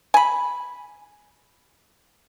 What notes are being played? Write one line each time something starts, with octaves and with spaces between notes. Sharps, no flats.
G#5 B5